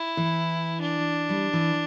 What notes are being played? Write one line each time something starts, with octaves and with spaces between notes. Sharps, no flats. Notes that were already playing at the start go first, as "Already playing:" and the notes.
Already playing: E4
E3
D4
G3
E3